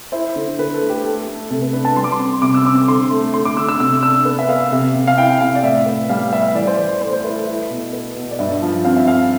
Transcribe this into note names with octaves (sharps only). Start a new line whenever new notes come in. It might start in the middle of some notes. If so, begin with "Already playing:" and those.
E4 C5
D3
D3 B4
A4
A3
G4
A3 A4
A3
C3 A4
B4
D4 B4
A5
G3 C6
D6
C6
C4
C3 D6
E6
C4 D6
D3 C6
A3
D3 C6
D6
D3 E6
E6
C3 E6
D4 E6
B3
E5
B3 F5
C3
C3
F5
E4 G5
G5
C3 F5
D5
A2 E5
B3
G3 F5
B3 E5
E3 D5
C5
E3 D5
A3 C5
C5
E4 B4
A4
E4
B2
B3
B2
D5
G2 E5
F3
C4 F5
E5
G2 F5